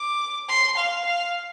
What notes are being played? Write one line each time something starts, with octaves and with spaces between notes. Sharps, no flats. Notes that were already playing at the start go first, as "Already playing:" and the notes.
Already playing: D6
C6
F5
F5